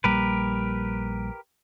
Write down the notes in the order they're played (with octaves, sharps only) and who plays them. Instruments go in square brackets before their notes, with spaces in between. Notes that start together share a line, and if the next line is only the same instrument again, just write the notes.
[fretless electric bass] A#1 G3 A#3 [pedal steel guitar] G4 A#4 B4